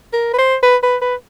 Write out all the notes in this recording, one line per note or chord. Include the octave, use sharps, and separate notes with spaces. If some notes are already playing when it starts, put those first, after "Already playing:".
A#4
B4
C5
B4
B4
B4